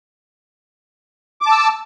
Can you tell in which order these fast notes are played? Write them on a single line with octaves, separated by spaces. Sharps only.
D6 A5 E6